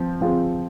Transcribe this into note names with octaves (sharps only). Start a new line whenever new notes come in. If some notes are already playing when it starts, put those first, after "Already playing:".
Already playing: F3 C4
F3 C4 F4 G#4